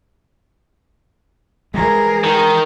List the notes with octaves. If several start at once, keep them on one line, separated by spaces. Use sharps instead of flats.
E3 G3 G#3 G#4 A#4
D#3